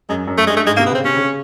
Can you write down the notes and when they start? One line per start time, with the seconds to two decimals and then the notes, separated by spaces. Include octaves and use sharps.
0.09 F#2 G#3
0.27 F#2
0.38 A3
0.47 G2 G#3
0.57 A3
0.66 G#2 G#3
0.77 A#3
0.79 C3
0.86 B3
0.92 C#3 C4
1.04 C3 C#4
1.16 C#3